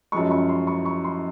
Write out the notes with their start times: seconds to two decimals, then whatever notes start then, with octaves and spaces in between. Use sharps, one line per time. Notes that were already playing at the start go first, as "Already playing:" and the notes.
0.12 F#2 F3 G#3 C#6
0.31 C#6
0.49 C6
0.67 C#6
0.85 C#6
1.04 C6